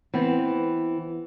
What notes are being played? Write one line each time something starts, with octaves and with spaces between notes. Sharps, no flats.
E3 B3 C4